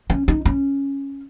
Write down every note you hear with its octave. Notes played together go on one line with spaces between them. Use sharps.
C#4
D#4
C#4